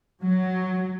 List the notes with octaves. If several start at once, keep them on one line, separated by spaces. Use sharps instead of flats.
F#3